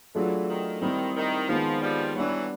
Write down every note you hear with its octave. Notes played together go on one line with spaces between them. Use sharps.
E3 F#3 A3 D4 F4 G#4
D#3
D#3 G3 C4 E4
D#3
D#3 F3 G#3 B3
F3 G3
E3 F#3 G3 B3 D4